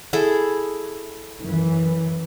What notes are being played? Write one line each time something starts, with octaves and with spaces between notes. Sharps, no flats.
E4 G#4 A4
F#2 E3